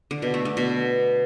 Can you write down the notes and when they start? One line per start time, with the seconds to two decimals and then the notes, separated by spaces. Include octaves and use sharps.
0.11 D3
0.22 B2
0.34 A3
0.45 D3
0.57 B2